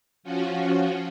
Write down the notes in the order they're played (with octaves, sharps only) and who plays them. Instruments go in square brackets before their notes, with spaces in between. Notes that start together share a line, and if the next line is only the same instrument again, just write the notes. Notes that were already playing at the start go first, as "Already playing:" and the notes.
[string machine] F3 C#4 F4 F#4